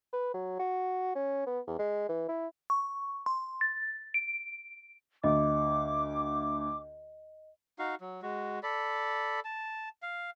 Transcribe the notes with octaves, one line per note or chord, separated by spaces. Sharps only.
B4
F#3
F#4
C#4
B3
E2
G#3
E3
E4
C#6
C6
A6
D7
D2 D#5 D6
D#4 F#4 F5
F#3
G#3 F#4
A4 D5 B5
A5
F5